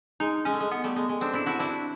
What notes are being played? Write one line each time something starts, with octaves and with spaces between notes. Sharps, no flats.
G#3 D#4
G#3 C#4
A3
G#3
G#3 B3
G3 A3
G#3
G#3
C4 D4
D4 E4
E4 F#4
D4 E4